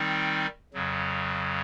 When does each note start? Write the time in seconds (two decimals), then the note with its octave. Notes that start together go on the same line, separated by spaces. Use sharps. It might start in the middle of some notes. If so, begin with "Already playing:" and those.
Already playing: D#3 G3 C4 D#4
0.74 F2 C#3 F#3